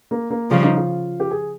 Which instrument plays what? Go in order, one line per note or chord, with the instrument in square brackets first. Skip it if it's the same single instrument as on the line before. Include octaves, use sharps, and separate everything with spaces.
[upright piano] A#3
A#3
[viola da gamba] C#3 F3 [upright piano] G3
[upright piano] D#4
F4
G4
G#4